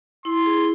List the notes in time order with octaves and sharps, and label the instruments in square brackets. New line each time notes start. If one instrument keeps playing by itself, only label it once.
[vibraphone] E4 [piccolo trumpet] C6
[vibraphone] G#4